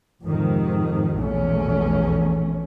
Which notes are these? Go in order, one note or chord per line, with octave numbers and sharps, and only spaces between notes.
F2 G#2 C3 D#3
A#1 E2 B2 A3 C#4